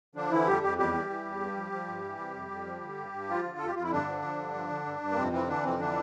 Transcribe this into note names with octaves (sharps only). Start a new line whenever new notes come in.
D3 F3 D4
D3 E3 E4
F2 G3 G4
F2 G3 G4
E2 G3 G4
E3
E3
E2
G2
F3
F3
G2
E3
C3
F2
F2
F3
D3
G2
G2
F3 F4
D3
F2 A4
G4
F2 F4
E4
G2 D3 D4
F3
F3
G2
F3
D3
G2
G2
A#3
F2 C3 C4
C3 E3 C4
D3 E3 D4
F2 C3 C4
D3 E3 D4